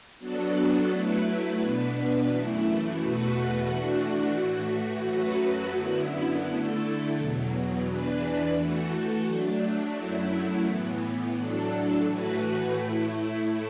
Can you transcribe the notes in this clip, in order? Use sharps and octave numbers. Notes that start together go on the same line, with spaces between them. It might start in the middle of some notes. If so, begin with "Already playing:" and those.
F#3 B3 D4 F#4 A4
F#3 A3 E4 B4
B2 B3 D4 B4
F#2 E3 A3 E4
E2 B2 A3 F#4 B4
E3 A3 D4 F#4
A2 E3 A3 F#4
F#2 F#3 A3 F#4 B4
F#2 D3 B3 E4
D3 A3 E4 A4
E2 B2 F#3
E2 E3 D4 B4
E3 A3 F#4 A4
F#3 A3 D4
F#2 F#3 A3 E4
A2 E3 B3
A2 F#3 D4 A4
A2 E3 A3 F#4 B4
A2 A3 E4